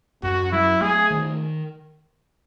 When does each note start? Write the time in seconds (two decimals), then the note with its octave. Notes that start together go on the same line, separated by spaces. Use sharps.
0.23 F#2 F#4
0.52 F#3 E4
0.81 A3 G#4
1.10 D#3